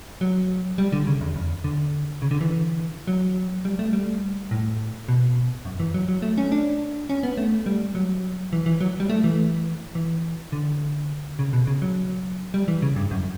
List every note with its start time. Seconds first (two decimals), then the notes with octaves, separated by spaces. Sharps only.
0.21 F#3
0.78 G3
0.92 D3
1.07 C#3
1.21 E2
1.36 E2
1.64 D3
2.22 C#3
2.31 D3
2.41 E3
3.07 F#3
3.65 G3
3.79 A3
3.93 G3
4.51 A2
5.08 B2
5.65 F#2
5.80 E3
5.94 F#3
6.08 F#3
6.22 A3
6.38 C#4
6.52 D4
7.10 C#4
7.23 B3
7.37 A3
7.66 G3
7.95 F#3
8.53 E3
8.66 E3
8.81 F#3
9.00 G3
9.09 A3
9.24 E3
9.95 E3
10.52 D3
11.39 C#3
11.53 B2
11.67 C#3
11.82 F#3
12.54 G3
12.68 E3
12.82 C#3
12.96 G2
13.11 F#2